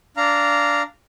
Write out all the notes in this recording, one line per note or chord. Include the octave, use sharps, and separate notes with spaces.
D4 F5 A#5